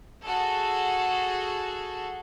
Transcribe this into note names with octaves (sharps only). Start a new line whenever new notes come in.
F#4 G#4 A4